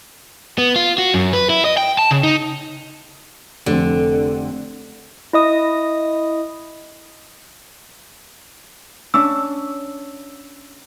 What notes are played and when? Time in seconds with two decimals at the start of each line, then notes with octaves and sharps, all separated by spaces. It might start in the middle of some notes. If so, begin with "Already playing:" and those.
0.58 B3
0.76 F4
0.98 F#4
1.14 F#2
1.33 B4
1.50 E4
1.65 D#5
1.77 G5
1.99 A5
2.11 C#3
2.23 D#4
3.66 F1 D3 C4
5.33 E4 D#5 D#6
9.14 C#4 D4 E6